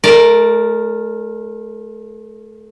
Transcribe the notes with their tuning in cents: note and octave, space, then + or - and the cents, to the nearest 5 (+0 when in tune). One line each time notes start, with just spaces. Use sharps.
A3 -35 A#4 +0 D5 +0